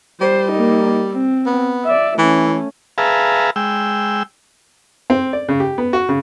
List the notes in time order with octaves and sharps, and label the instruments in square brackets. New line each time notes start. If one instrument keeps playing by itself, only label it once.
[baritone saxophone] G3 [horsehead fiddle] C5
[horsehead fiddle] A#3 D#4
C4
[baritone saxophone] B3
[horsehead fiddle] D5 E5
[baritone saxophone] E3 [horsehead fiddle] A3 C#4
[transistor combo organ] G#4 B4 E5 F5 A5 A#5
G#3 G5 E6
[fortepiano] C4
D5
C#3
G4
B3
F#4
C#3